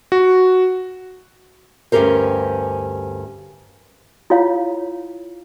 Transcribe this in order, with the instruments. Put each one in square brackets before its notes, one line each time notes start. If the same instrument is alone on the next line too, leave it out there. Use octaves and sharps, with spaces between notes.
[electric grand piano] F#4
[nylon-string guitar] D2 G2 C#4 G4 A#4 C5
[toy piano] E4 F4 C#5 F5